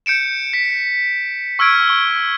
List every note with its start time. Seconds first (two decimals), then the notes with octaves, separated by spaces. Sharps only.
0.06 G6 C#7 D7 E7
0.53 B6
1.59 C#6 E6 F6 G#6 D7
1.88 C#6 G7